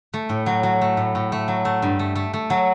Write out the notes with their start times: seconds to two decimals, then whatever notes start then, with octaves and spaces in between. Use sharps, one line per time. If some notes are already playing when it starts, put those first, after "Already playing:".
0.14 A3
0.29 A2
0.46 F#3
0.63 F#3
0.81 A3
0.97 A2
1.15 A2
1.32 A3
1.48 F#3
1.65 A3
1.82 G2
1.99 A3
2.15 A3
2.34 A3
2.50 F#3